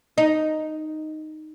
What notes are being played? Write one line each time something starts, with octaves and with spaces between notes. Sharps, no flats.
D#4